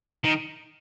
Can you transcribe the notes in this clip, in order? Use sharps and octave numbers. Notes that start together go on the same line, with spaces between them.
D#3